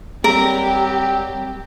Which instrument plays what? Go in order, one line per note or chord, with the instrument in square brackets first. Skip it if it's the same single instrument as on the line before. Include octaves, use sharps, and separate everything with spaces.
[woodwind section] F#3 G3 C4 [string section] G4 [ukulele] A#4